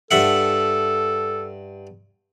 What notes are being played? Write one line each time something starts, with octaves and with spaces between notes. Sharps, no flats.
G2 A4 E5 F#5